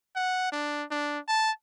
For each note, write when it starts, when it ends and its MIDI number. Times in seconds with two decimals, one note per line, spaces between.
0.16 0.48 78
0.52 0.84 62
0.91 1.19 62
1.28 1.51 81